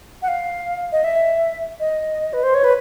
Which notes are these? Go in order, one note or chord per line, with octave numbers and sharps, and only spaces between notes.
F#5
F5
D#5
E5
D#5
B4
C5
C#5
B4